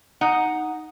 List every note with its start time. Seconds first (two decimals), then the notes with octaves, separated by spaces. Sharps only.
0.21 D#4 F#5